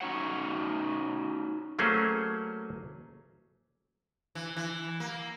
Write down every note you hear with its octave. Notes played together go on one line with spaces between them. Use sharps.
C#4 D#4 F#4 C#5 F#5
F#3 A3 A#3 C#4 G#4 C5
E3
E3
A#3